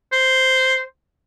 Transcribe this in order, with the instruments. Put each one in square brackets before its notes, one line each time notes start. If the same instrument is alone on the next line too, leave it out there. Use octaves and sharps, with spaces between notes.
[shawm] C5